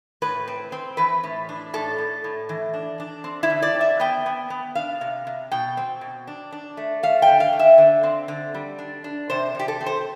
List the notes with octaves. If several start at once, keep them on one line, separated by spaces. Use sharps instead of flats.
A2 B4
C4
C4
E3 B4
A2
D4
A2 A4
A2
A2
E3
D4
D4
C4
E4
D3
D5
C4
E5
B3 G5
B3
B3
D4 F5
C3
C3
B2 G5
C4
B2
D4
D4
A3
A3 F5
G5
D3
F5
A3
E5
D3
C4
D3
G3
D4
D4
C3 C5
C3 G4
A4
C4
C5